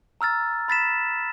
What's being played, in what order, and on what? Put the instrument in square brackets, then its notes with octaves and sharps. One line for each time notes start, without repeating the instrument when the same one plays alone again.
[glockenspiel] A#5 E6 F6 A6
B5 A6 B6 E7